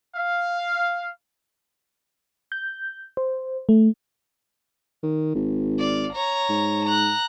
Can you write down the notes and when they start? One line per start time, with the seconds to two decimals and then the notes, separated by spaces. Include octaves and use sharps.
0.16 F5
2.52 G6
3.17 C5
3.69 A3
5.03 D#3
5.35 G#1
5.78 D5 F5
6.13 C#5 A#5
6.50 G#2
6.85 A#5 F#6